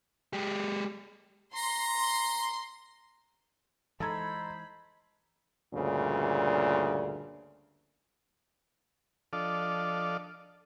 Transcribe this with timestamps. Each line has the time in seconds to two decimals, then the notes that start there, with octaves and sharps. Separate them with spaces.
0.33 G#3 G4
1.54 A#5 C6
1.96 C6
4.00 E3 G#3 D#4 A4 C5 A#5 B5 G#6
5.72 D2 G2 A#2 C#3
9.33 F3 D4 A4 D5 D#5 F5